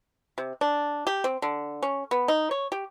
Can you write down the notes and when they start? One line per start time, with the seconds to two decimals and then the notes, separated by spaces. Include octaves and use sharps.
0.38 C3
0.61 D4
1.07 G4
1.24 C4
1.42 D3
1.82 C#4
2.11 B3
2.28 D#4
2.51 C#5
2.72 G4